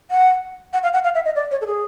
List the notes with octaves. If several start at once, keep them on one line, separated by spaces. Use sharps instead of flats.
F#5
F#5
F5
F#5
F5
E5
D#5
D5
C#5
A4
G#4